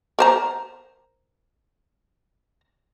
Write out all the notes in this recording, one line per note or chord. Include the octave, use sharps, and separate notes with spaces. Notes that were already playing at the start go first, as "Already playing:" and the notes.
A#4 C5 A#5